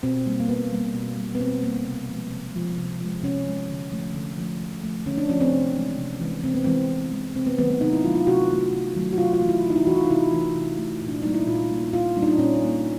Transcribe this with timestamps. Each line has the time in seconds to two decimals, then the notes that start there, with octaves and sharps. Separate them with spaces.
0.03 B2 C4
0.26 G3 A#3
0.40 A#3
0.49 B2 B3
0.72 G3 A#3
0.94 B2
1.17 G3 A#3
1.35 B3
1.40 B2 C4
1.63 G3 A#3
1.86 C3
2.09 F3 G#3
2.31 C3
2.54 F3 G#3
2.78 C3
3.01 F3 G#3
3.23 C3 C#4
3.46 F3 G#3
3.69 D3
3.92 F3 A3
4.14 D3
4.38 F3 A3
4.60 D3
4.84 F3 A3
5.06 D3 C#4
5.18 D4
5.29 F3 A3 C#4
5.41 C4
5.52 C3
5.76 E3 G#3
5.98 C3
6.21 E3 G#3
6.43 C3 C4
6.54 B3
6.64 E3 G#3 C4
6.90 C3
7.12 E3 G#3
7.35 C3 C4
7.46 B3
7.58 D#3 F#3 A3 B3
7.70 B3
7.81 C3 D#4
7.93 E4
8.04 D#3 F#3 A3 F4
8.15 F4
8.27 C3 F#4
8.50 D#3 F#3 A3
8.73 C3
8.95 D#3 F#3 A3
9.13 F#4
9.18 C3 F4
9.33 F4
9.41 E3 A3
9.49 E4
9.64 C3
9.70 D#4
9.76 E4
9.87 E3 A3 F#4
9.98 F4
10.05 D#4
10.10 C3 E4
10.33 E3 A3
10.55 C3
10.78 E3 A3
11.02 A#2
11.08 D4
11.22 G3 A#3 D#4
11.34 E4
11.47 A#2 F4
11.70 G3 A#3
11.93 A#2 F4
12.16 G3 A#3 D4
12.23 D#4
12.27 D4
12.38 A#2 C#4
12.61 G3 A#3